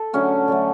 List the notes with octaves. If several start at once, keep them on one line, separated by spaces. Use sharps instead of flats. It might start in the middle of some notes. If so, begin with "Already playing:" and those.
Already playing: A4
D3 F#3 A3 C#4
D3 F#3 A3